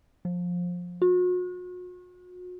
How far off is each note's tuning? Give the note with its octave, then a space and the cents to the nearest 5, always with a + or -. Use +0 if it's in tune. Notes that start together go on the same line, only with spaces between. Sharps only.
F3 +20
F#4 -40